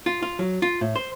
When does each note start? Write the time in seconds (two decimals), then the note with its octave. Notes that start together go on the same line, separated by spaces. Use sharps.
0.06 F4
0.23 F4
0.39 F#3
0.62 F4
0.81 A2
0.96 C5